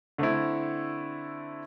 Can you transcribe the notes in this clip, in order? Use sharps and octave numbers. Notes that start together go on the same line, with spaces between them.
D3 A3 C4 E4